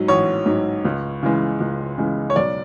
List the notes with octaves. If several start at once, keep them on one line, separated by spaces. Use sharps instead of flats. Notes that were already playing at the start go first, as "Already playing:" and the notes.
Already playing: G#2 F#3
A1 C#5
G#2 F#3
C#2
C#3 E3 G#3
C#2
C#3 E3 G#3
C#5
B1 D5